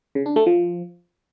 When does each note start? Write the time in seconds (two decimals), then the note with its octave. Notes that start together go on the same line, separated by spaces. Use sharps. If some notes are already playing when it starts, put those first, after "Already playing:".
0.15 C#3
0.26 D4
0.36 A3
0.46 F3